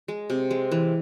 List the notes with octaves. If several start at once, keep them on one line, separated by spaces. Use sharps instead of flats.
G#3
C3
G#3
E3